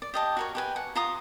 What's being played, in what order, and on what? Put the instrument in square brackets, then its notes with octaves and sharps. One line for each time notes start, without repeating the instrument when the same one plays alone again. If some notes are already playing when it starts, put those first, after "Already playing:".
[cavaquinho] D5
G4 D#5 A5
F#4 A#4 C#5
G4 B4 G#5
F#5
F4 A#5 D#6